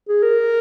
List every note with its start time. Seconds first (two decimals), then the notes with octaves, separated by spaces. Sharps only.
0.08 G#4
0.23 A#4